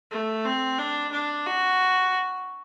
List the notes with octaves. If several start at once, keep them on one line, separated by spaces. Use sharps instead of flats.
A3
C4
D4
D4
F#4